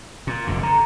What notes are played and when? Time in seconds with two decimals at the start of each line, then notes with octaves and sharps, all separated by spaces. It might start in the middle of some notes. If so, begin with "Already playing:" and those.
0.27 A#2
0.47 F1 F#2 D3
0.63 D3 A#5